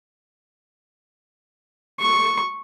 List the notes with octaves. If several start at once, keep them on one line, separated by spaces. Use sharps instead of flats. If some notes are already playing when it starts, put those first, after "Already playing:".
C#6